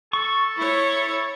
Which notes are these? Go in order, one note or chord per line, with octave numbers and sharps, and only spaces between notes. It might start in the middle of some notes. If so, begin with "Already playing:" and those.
A4 C#6
E4 C#5
A4